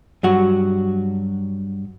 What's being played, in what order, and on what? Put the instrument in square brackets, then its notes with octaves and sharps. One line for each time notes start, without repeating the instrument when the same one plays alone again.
[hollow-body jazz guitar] G2 F#3 F#4